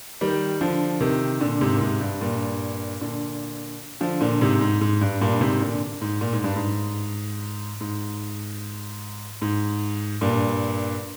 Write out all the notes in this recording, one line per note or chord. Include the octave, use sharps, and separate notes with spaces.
D#3 G3
D3 F3
C3 D#3
A#2 D3
G#2 C3
A#2
G#2 C3
G2
G2 A#2
A#2 D3
D3 F3
A#2 D3
G#2 C3
G#2
G#2
G2
G2 A#2
G#2 C3
A#2 D3
G#2
A#2
G#2
G2
G#2
G#2
G#2
G2 A#2